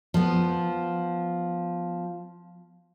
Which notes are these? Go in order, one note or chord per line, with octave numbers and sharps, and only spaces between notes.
F3 B3